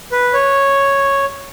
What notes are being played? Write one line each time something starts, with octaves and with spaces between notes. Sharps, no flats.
B4
C#5